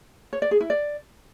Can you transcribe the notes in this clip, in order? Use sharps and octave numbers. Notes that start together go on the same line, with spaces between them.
C#5
D5
G#4
E4
D5